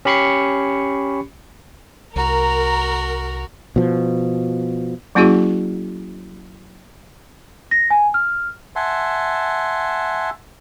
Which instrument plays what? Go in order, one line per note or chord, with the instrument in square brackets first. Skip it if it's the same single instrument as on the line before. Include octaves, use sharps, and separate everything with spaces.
[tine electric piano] C#4 G4 B5 C#6 C7 C#7
[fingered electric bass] C2 [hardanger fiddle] F#4 [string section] A#4 [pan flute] A#5
[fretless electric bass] B2 F3
[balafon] F#3 A#3 C#4 E4 F#4 G#4
[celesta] A#6
G#5
F6
[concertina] E5 F#5 G#5 A5 C6